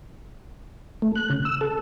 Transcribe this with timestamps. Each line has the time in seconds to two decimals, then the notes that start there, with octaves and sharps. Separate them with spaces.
1.02 A3
1.16 F#6
1.30 C#3
1.45 E6
1.61 A4